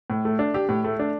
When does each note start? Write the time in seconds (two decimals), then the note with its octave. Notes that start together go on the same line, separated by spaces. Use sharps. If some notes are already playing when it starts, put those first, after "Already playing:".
0.10 A2
0.25 A3
0.39 D4
0.54 G4
0.69 A2
0.84 A3
0.99 D4